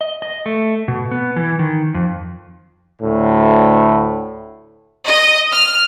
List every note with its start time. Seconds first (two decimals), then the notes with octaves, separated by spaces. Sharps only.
0.01 D#5
0.22 D#5
0.46 A3
0.88 B2
1.11 B3
1.36 E3
1.59 D#3
1.94 F2
3.02 D2 A2
5.07 D#5
5.52 F6